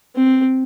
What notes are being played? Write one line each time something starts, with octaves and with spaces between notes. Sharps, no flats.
C4